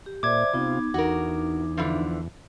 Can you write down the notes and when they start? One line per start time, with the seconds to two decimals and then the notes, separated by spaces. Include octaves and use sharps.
0.06 G4
0.23 A#2 C5 D5 E5 D6 G#6
0.54 C3 B3 D#4 F4
0.94 E2 D4 D#4 F#4 A#4
1.77 D3 E3 F3